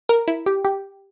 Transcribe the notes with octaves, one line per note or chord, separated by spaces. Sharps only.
A#4
E4
G4
G4